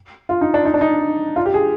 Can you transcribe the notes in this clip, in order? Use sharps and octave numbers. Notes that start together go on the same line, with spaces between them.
F4
D#4
D4
D#4
D4
D#4
F4
G4
G#4